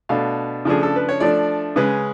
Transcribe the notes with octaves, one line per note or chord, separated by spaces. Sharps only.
B2 A3 D4 F5
C#3 F3 A3 D4 G#4
A4
B4
C#5
F3 A3 D4 D5
C#3 G#3 C#4 B4